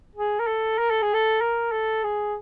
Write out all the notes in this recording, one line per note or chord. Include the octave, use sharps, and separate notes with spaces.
G#4
A#4
A4
A#4
A4
G#4
A4
A#4
A4
G#4